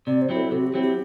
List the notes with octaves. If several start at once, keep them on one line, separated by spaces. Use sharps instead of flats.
C3 D5
C5
F#3 C4 E4
A4
C3 F#4
G4
F#3 C4 E4
G4